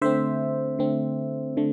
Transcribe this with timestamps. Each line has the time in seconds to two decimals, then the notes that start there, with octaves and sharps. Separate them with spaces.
0.02 D3 A3 C4 C5 E5
0.79 D3 A3 C4
1.57 D3 A3